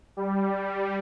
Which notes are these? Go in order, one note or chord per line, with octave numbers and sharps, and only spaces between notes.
G3